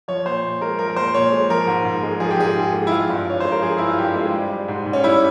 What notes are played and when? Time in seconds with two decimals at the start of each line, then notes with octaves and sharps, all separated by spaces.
0.08 F3 C#5
0.26 A#2 C5
0.44 A#2
0.61 G#3 A#4
0.79 F3 A#4
0.90 A#4
0.96 A#2 C5
1.14 A#2 C#5
1.32 G#3
1.50 F3 A#4
1.67 G#2
1.85 G#2
2.03 G#3
2.20 F3 G#4
2.30 G4
2.38 G#2 G#4
2.56 G#2
2.73 G#3
2.87 E4
2.91 F3 F4
3.09 G2
3.27 G2 C#5
3.40 G#3 C5
3.52 A#4
3.62 F3 G#4
3.78 G2 E4
3.88 F4
3.98 G2 G4
4.16 G#3
4.33 G3
4.50 G3
4.68 G#2
4.86 G#2
4.93 C#4
5.04 G3 E4